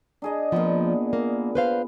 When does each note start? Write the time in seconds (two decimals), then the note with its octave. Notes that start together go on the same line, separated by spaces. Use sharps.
0.22 D4 G#4 D#5
0.52 A#2 F3 B3
1.13 A#3
1.55 B4 C5 F5